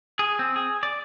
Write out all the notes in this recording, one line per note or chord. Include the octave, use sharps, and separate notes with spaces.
G#4
C4
G#4
D5